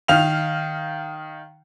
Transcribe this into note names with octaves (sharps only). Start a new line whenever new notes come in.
D#3 F5 F6 F7